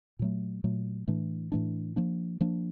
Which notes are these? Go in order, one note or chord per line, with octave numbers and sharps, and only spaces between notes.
A#2 F#3 A3
A#2 F#3 A3
A2 E3 A3 D4
A2 E3 A3 D4
F3 A#3 D4
F3 A#3 D4